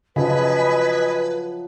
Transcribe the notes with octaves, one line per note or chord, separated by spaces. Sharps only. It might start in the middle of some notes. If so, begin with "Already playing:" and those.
C#3 F3 F#3 E4 B4 D#5 G#5 B5